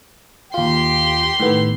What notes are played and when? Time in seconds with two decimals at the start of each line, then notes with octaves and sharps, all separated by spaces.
0.54 D#2 F4 G4 C6
1.40 A2 D#3 B3